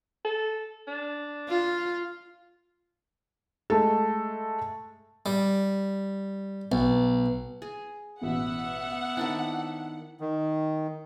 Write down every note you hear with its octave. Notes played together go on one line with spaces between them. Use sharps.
A4
D4
F4
G#3 A3 A4
G3
B1
G#4
A1 B2 B3 E5 F#5
D#3 C4 D4 E4
D#3